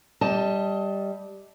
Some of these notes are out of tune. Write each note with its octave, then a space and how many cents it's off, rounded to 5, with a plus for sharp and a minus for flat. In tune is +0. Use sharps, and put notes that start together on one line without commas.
G3 +0 D#5 +30 A5 +0